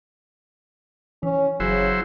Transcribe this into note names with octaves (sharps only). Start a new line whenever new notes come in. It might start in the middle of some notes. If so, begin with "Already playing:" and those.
E3 C#4
F#1 C#3 F#3 E4 C5